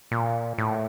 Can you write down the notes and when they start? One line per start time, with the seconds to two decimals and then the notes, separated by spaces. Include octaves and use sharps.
0.11 A#2
0.58 A2